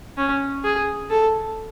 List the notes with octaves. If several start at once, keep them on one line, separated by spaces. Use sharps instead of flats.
C#4
G#4
A4